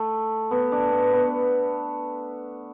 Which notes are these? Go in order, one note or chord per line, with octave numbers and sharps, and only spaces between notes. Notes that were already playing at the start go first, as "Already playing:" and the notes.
Already playing: A3
B3
D4
B3
B3